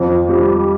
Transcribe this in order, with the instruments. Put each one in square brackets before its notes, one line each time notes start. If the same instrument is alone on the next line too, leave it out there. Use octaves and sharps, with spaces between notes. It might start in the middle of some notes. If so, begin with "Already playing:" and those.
Already playing: [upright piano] F2 [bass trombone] F3
[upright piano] G3